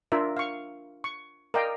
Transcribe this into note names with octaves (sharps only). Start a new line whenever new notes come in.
D4 F4 A#4 E5
F5 C#6
C#6
A#4 D5 D#5 F5 G5